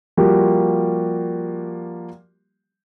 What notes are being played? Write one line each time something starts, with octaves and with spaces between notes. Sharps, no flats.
F3 G3 A#3 F#4 G4